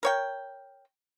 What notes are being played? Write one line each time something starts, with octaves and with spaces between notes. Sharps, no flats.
A#4 C#5 G5